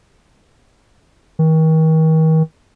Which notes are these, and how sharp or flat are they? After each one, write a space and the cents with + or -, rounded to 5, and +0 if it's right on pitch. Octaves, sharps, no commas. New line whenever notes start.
D#3 +40